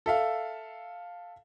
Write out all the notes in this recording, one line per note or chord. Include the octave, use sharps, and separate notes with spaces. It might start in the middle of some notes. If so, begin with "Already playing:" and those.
A4 E5 F5